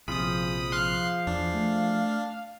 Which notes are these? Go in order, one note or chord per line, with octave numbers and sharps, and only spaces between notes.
A#1 C3 F3 F4 G#4 B5 D#6
F5 C6 F#6
E2 D4
A3